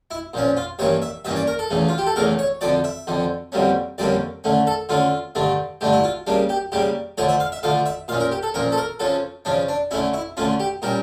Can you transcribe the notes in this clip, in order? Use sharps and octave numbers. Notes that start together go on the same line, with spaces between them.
E4
A#2 F3 C#4
F4
G2 E3 A#3 C#4 C#5
E5
G2 E3 A#3 C#4 E5
D5
A#4
A4
E2 C#3 E3 A3
F4
G4
A4
E2 C#3 E3 A3 A#4
C#5
F2 D3 F3 D5
E5
F2 D3 F3
F2 D3 G3 A#3 C#4
F2 D3 G3 A#3 C#4 D5
D3 A3 C#4
A4
D3 A3 C#4 F4
G2 D3 A3 D4
G2 D3 A3 D4 G4
E4
F4
C#3 G3 A#3 D4
G4
C#3 G3 A#3 G4
D3 F3 A3 C#5
E5
F5
E5
D3 F3 A3 F5
E5
A#2 F3 C#4 F5
A#4
G4
A4
A#2 F3 C#4 A#4
A4
A#4
C#3 F3 C#4 A4
C#3 F3 C#4 D4
D4
D3 A3 C#4 E4
E4
D3 A3 C#4 F4
G4
A#2 G3 C#4 A#4